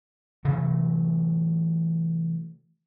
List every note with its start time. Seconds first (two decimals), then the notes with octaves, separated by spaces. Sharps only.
0.45 C3 E3 F#3 A3